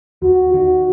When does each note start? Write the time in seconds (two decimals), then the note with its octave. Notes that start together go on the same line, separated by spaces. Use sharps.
0.22 D#2 F#4
0.54 D#3 F#4